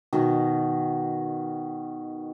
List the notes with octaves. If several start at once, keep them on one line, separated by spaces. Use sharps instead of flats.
B2 D#3